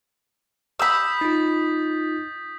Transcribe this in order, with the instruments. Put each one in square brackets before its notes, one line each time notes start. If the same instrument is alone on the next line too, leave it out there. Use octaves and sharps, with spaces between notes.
[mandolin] B5 E6 [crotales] D#6 G6 B6
[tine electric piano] D#4 F4 [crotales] A6